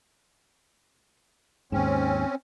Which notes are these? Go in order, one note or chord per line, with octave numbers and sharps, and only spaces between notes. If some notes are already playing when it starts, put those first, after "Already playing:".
D#2 G#2 C4 C#4